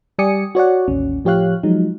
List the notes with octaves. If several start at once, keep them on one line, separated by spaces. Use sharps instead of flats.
G3 G4 D5 G#5 D#6 C#7
F#4 C#5 D5 F#5
A1 D#2 C#4
A2 F3 G4 C#5 F5 F#6
F3 F#3 G#3 D#4